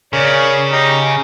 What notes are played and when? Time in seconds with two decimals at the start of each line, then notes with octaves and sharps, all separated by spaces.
0.13 C#3 A#4 C#5 D5
0.72 D#4 G4 A#5